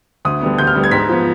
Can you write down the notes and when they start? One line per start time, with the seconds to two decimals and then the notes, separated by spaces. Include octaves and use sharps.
0.25 D2 D#6
0.41 D3 G3 B3
0.58 D2 G6
0.67 F6
0.75 D3 G3 B3
0.84 G#6
0.91 G#2 B6
1.09 F3 B3